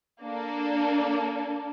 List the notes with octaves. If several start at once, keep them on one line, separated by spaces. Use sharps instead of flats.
A#3 D4 A4